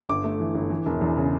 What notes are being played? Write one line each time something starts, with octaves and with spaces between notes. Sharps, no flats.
G1 D6
A3
E3
G1
E3
E1
E2
C#3